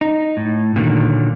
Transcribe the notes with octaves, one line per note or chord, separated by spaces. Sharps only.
D#4
A2
A#2 D3 D#3 F#3